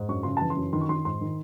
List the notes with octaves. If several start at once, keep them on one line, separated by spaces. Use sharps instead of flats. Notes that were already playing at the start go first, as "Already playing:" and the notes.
Already playing: G#2
F#2 C#6
C#3 C6
E3 A5
C6
F#2
D#3 C6
C#6
D#3 C6
G#2 C6
D#3